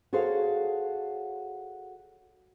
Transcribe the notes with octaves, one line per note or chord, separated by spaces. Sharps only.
F#4 G#4 A4 C5 C#5 F5